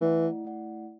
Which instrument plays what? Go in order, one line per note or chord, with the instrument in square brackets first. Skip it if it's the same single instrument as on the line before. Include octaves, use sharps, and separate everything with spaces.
[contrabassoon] E3 [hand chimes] A3 E4 D5 F#5
[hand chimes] A3 E4 D5 F#5